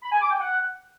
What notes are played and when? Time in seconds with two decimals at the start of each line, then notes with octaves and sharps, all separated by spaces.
0.03 B5
0.12 G#5
0.22 D6
0.31 G5
0.40 F#5